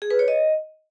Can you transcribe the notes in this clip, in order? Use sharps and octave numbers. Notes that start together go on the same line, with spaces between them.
G#4
B4
C#5
D#5